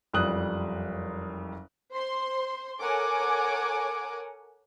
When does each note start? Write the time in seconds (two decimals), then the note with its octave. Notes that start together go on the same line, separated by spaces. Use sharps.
0.14 F#1 F2 G3 D#6 F#6 F#7
1.91 C5 C6
2.80 A4 A#4 C#5 F#5 G#5 D6